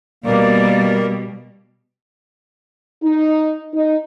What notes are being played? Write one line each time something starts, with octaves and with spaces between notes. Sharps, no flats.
B2 G3 A#3 D5
D#4
D#4